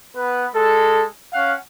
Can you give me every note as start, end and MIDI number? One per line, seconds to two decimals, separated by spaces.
0.15 0.45 59
0.15 0.45 71
0.54 1.04 56
0.54 1.04 69
1.33 1.54 61
1.33 1.54 77
1.33 1.54 78